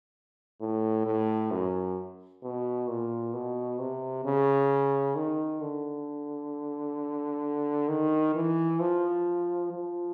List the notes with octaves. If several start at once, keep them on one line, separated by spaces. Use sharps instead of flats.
A2
A2
F#2
B2
A#2
B2
C3
C#3
D#3
D3
D#3
E3
F3
F3